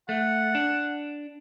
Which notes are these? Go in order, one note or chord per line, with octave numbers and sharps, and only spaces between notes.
A3 F#5
D4